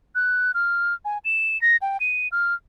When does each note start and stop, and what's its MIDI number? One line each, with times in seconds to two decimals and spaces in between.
0.15 0.52 90
0.54 0.94 89
1.05 1.18 80
1.25 1.60 100
1.62 1.77 94
1.82 1.97 79
2.00 2.28 99
2.32 2.54 89